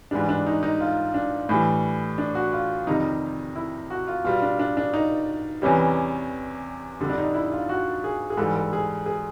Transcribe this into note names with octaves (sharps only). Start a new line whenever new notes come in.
G#2 E3 G3 D4
D4
D#4
D#4
F4
D4
A2 E3 G3
D4
F#4
F4
F2 C3 D#3 G3 D#4
E4
F#4
F4
B2 G3 F4
D4
D4
D4
D#4
E2 C3 E3 G3 C#4
F2 D3 G3
D4
D#4
E4
F4
F#4
G#4
G#4
G#2 E3 G3 A4
A4
G#4
G#4